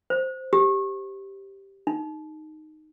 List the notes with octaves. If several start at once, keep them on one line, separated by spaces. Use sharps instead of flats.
C5
G4
D#4